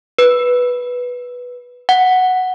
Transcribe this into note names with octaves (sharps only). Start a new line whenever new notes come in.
B4
F#5